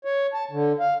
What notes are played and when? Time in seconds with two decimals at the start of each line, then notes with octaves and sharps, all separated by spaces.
0.05 C#5
0.34 A5
0.51 D3
0.80 F5